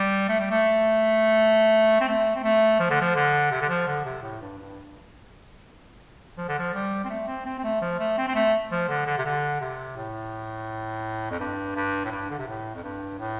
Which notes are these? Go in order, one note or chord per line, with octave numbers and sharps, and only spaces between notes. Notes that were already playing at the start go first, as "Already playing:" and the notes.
Already playing: G3
A3
G3
A3
C4
A3
C4
A3
F3
D3
F3
D3
C3
D3
F3
D3
C3
A2
G2
G2
F3
D3
F3
G3
C4
A3
C4
C4
C4
A3
F3
A3
C4
C4
A3
F3
D3
D3
C3
D3
C3
A2
F2
G2
G2
A2
G2
D3
C3
A2
F2
G2
A2